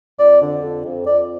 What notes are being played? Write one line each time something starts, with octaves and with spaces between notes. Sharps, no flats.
F2 D5
D3
F2
F2
F2 D5